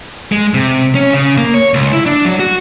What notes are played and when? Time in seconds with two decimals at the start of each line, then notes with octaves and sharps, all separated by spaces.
0.32 G#3
0.54 C3
0.95 C#4
1.13 C#3
1.38 A#3
1.54 C#5
1.74 C#2
1.93 E4
2.06 D4
2.25 F#3
2.40 F#4